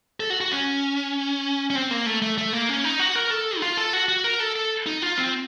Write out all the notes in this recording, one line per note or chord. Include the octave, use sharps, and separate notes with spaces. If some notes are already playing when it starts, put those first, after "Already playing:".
A4
F#4
F#4
C#4
C#4
C4
A#3
A3
A3
A3
A#3
C#4
D#4
F#4
A#4
A4
D#4
F4
A4
F#4
F#4
A#4
A4
A4
D#4
F4
C4